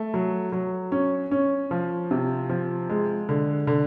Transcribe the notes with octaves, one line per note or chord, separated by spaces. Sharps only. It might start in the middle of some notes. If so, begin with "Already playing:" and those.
Already playing: A3
F#3
F#3
C#4
C#4
F3
C3
F3
G#3
D3
D3